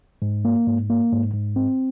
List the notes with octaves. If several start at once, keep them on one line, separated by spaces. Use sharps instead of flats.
G#2
A#3
G#2
A#3
G#2
G#2
C4